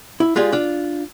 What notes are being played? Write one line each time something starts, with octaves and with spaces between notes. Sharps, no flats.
E4
G#3 F4 G4 G#4 D5 F5
D4 F4